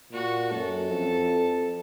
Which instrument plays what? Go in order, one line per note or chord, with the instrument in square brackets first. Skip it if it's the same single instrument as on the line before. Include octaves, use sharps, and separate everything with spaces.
[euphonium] A#2 [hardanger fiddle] F#4
[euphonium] F#2 [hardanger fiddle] A4
[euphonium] F2